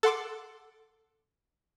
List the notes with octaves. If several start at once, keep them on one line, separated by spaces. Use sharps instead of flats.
A4 F#5 C6 D6